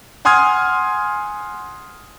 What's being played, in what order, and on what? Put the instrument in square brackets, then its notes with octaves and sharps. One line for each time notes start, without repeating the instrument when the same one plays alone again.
[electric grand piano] F#5 G#5 C6 D#6 F6 G#6